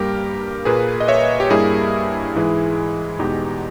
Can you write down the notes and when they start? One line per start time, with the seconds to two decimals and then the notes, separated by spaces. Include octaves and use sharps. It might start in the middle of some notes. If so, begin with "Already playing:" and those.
Already playing: G2 G3 A#3 G4 A#4
0.65 A#2 A#3 G#4 B4
1.00 D#5
1.08 C#5 E5
1.40 G4
1.50 G2 G3 A#3 E4 G#4
2.35 G#2 E3 G#3
3.19 E2 B2 G#3 D#4 G4